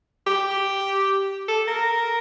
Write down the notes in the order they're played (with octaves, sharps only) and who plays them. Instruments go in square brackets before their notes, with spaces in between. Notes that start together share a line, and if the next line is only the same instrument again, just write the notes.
[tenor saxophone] G4
A4
A#4